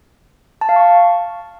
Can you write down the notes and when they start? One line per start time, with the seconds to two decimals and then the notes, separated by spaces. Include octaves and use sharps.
0.61 A5
0.69 F5
0.76 C#6